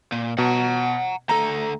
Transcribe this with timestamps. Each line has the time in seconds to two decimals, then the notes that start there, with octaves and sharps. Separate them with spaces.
0.12 A#2
0.38 B2 F#5 A#5
1.29 D2 A4 A#5